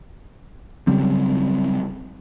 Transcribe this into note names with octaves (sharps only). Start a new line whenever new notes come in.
C#3 F#3 G3 C4